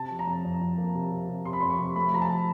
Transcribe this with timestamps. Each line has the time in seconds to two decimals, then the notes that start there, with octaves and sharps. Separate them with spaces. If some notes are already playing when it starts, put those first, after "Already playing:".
Already playing: C3 A5
0.11 F3
0.19 A#5
0.27 F2
0.45 F2
0.61 F2
0.78 A#3
0.95 C3
1.11 C3
1.28 C3
1.45 C3 C6
1.53 B5
1.60 F2 C6
1.70 C#6
1.79 C3
1.96 A3 B5
2.12 F3 A#5
2.21 A5
2.30 F3